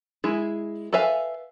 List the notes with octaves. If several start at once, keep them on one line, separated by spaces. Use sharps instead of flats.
G#3 E4 G#4
A4 B4 E5 F5 G#5